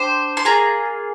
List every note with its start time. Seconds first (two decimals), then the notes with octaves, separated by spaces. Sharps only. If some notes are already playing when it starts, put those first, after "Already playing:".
Already playing: D4 G4 C5
0.37 C6
0.45 A#3 F4 G#4 A#5